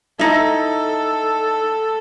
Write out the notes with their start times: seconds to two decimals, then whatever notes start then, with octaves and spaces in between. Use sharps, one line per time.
0.19 D#4 E4 A4